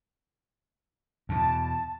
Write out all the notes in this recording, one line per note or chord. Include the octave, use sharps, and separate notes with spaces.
E2 B2 A5